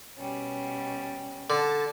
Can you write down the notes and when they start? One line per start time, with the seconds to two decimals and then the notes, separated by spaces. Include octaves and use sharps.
0.17 B2 G3 C#4
1.50 D3 A5